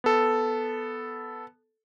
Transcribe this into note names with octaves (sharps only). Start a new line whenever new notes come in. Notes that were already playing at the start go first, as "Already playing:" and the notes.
B3 A4